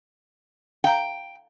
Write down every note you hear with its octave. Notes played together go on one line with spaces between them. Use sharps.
F5 G5 A#5